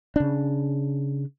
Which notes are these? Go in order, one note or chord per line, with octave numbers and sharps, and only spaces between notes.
C#3 D4